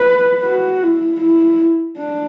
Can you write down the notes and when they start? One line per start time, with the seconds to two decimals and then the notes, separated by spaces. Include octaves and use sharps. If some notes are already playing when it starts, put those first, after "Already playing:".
Already playing: B4
0.45 F#4
0.83 E4
1.21 E4
1.98 D4